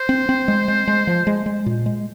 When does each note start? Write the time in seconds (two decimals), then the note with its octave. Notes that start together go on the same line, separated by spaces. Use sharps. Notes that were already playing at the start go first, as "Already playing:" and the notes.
Already playing: C5
0.09 C4
0.29 C4
0.48 G#3
0.68 G#3
0.88 G#3
1.07 F3
1.27 G#3
1.46 G#3
1.66 A#2
1.86 G#3